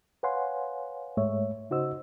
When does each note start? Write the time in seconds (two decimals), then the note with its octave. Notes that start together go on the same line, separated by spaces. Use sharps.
0.23 B4 C#5 F5 F#5 G#5 C6
1.17 G#2 G#3 A3 C#5 E5
1.71 C#3 D#4 F#4 C5 D#5 E6